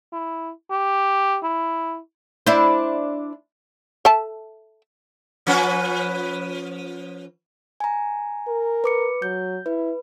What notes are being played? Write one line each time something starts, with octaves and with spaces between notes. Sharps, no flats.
E4
G4
E4
D4 E4 C5
A4 E5 A5
F3 C#4 B4
G#5 A#5
A#4
B4 D6 C#7
F#3 G6
E4 B4